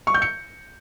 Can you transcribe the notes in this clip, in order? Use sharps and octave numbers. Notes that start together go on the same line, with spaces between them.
C#6
G6
C#7